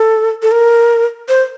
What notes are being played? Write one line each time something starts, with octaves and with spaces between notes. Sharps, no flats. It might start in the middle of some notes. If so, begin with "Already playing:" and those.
Already playing: A4
A4
A#4
C5